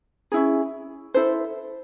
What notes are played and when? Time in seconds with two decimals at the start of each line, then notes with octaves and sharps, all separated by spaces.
0.32 C#4 E4 G#4
1.14 E4 A4 C5